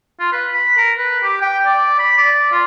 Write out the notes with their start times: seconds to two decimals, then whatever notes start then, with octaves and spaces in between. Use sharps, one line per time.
0.20 F4
0.32 B4
0.53 B5
0.77 A#4
0.98 B4
1.23 G4
1.41 G5
1.65 D5
1.99 B5
2.17 D5
2.51 F4